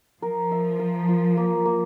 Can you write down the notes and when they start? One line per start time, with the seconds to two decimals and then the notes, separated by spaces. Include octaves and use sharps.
0.22 F3 A#4
0.51 E5
0.79 A#4
1.09 F4
1.37 A#3
1.66 A#3